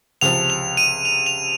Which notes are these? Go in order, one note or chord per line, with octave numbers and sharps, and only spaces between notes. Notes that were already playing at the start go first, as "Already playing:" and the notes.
C#2 C3 F3 F7
F7
D#7
F7
F7